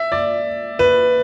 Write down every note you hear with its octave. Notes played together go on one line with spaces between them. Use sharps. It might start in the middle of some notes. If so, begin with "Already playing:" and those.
Already playing: E5
D5
B4